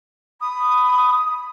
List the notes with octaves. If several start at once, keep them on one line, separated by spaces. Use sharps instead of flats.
B5 D#6